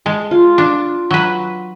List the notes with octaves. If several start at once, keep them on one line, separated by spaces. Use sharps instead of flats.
G#3 A5
F4
D4
F#3 B4